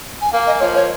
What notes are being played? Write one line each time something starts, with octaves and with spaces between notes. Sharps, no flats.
G#5
A#3 F5
D#5
F3 C#5
C#5